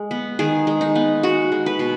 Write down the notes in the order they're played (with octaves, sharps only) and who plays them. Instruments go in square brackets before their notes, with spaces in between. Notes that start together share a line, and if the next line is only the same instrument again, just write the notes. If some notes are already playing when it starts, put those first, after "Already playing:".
Already playing: [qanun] G#3
B3
D#3 G#4
G#3
D#4
B3
G#3 F#4
G#3
B4
B2